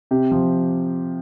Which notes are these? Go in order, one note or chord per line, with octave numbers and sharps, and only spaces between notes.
C3 G4
F3